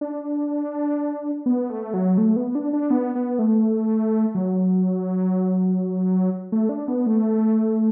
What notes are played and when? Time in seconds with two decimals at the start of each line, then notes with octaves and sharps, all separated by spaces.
0.01 D4
1.46 B3
1.70 A3
1.94 F#3
2.18 A3
2.36 B3
2.55 D4
2.73 D4
2.90 B3
3.15 B3
3.39 A3
4.35 F#3
6.52 A3
6.69 D4
6.88 B3
7.06 A3